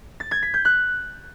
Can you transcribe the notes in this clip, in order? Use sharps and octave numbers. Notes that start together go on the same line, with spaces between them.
A6
G#6
B6
G6
F#6